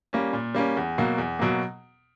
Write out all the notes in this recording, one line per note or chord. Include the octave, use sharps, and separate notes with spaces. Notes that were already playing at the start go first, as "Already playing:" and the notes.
G3 A#3 C#4
A#2
G3 A#3 C#4
E2
B2 F#3 A#3
E2
B2 F#3 A#3